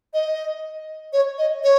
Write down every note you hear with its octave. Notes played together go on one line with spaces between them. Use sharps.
D#5
C#5
D#5
C#5